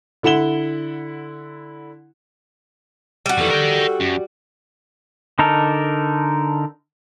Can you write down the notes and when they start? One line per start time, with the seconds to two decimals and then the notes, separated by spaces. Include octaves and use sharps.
0.23 D3 E4 F#5 E7 G7
3.26 G3 F#4
3.38 F2 E3 A4
3.50 A#4 G5
4.00 F#2
5.39 D3 D#4 A4 A#4